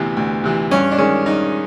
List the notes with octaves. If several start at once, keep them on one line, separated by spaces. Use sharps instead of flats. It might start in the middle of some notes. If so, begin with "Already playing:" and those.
Already playing: D2 C3 E3 B3
D2
C3 E3
G2 C#4
D4
D#3 G#3 C#4
G2 D#4